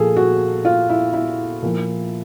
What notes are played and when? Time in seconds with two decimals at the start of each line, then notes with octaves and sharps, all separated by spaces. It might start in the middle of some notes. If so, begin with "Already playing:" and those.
Already playing: A#2 F3 G#4 A4
0.16 F#4
0.65 F4
0.90 E4
1.13 E4
1.63 A#2 F3